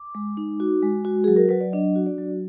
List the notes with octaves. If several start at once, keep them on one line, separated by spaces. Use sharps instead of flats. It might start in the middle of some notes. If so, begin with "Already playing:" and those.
Already playing: D6
G#3
D#4
F#4
G#3
F#4
F#3 G#4
A#4
F#3 B4
D5
D4 D#5
F#4
D5
F#3